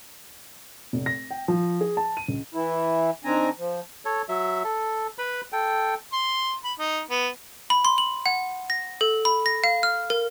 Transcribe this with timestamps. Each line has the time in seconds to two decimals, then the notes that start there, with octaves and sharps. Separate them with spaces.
0.93 F1
1.06 A#6
1.31 G5
1.48 F3
1.81 G#4
1.97 A5
2.17 D#7
2.28 C#2
2.54 E3 E4
3.24 D#3 C4 D4 G#5 A#5
3.58 F3
4.05 A4 C#5
4.29 F#3 E5
4.64 A4
5.18 B4 B5
5.52 A4 G5
6.13 C6
6.64 B5
6.79 D#4
7.10 B3
7.70 B5
7.85 C6
7.98 F#7
8.26 F#5
8.70 A#6
9.01 A4
9.25 B5
9.46 A#6
9.64 F5
9.83 F6
10.10 A#4